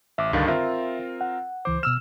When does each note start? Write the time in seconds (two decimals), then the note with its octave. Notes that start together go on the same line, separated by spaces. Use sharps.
0.18 A1 E5 D6
0.33 C#2 G2 D3 D#3 F5 A6
0.48 C4 F4 A#4 E5
1.21 F#5
1.65 C#2 E3 C5 D6
1.83 B2 E6 F6 E7